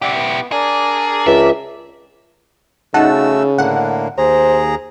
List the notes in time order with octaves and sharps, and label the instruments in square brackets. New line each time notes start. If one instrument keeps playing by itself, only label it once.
[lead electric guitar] E4 G4 [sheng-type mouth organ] D5 E5 F#5
[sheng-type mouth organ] B3
[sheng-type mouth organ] D4 A#4 D5 [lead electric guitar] G#4
[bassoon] C#2 [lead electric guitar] E5
[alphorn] C#3 [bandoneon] A3 F#4 E6 [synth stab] D#4 F#5 A5
[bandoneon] A2 D3 A#3 [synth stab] F#5
[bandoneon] D#2 G#4 A#5 [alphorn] C5